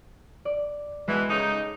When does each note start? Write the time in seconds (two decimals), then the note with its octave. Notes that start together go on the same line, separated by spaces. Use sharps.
0.45 D5
1.08 B2 E3 G#3
1.28 C#3 D#4 A4 D6 D#6